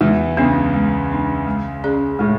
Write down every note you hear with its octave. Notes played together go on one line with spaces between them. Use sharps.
E2 E3 G#3
C#2 C#3 B3 D4
G#3
B3 D4
G#3
C#4 G#4 D5
A2 G#3